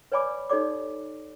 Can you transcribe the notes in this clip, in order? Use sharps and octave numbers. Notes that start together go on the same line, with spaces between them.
B4 C#5 D5 G#5 B5 D6
D#4 G4 A4 C#5 D5 D6